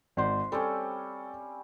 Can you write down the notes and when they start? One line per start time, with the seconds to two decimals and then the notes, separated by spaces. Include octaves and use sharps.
0.17 G#1 C5 D5
0.52 G3 C4 C#4 A4